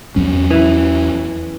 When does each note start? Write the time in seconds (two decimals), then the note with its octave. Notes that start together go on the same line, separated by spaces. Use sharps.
0.16 E2 F#3 C#4
0.50 E3 E4